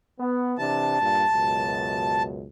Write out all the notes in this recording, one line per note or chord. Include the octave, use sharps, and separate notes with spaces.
B3
C3 E3 D4 A5
G2 A#2
C#2 F#2 B2